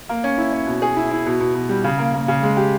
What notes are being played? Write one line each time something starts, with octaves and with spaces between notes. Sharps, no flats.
A#3
C#4
E4
C#4
B2
G#4
E4
E4
B2
B2
B2
G3
C#3
A#3
A#3
C#3
G#3
G4